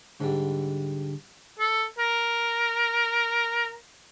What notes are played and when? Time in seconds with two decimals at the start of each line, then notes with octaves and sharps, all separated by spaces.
0.21 G#2 D3 G3
1.59 A4
1.99 A#4